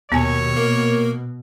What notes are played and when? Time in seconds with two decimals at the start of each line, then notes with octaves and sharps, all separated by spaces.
0.12 D#2 B2 B3 C#5 G#5
0.56 A#3